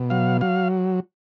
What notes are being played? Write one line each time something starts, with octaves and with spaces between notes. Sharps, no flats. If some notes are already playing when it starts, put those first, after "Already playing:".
Already playing: B2
F#3 F5
F#3 F5